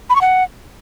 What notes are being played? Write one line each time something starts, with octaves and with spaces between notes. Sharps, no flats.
B5
C#6
F#5